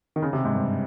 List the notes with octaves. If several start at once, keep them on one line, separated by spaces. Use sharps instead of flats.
D#3
C#3
C3
G#2
G2